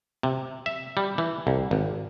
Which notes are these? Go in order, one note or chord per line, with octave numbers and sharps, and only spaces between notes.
C3
E5
G3
E3
C2
G#1